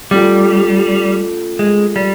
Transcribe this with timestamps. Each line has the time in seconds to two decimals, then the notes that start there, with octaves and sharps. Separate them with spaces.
0.11 G3 A3 C#4 F4 A4
1.59 G#3
1.96 G3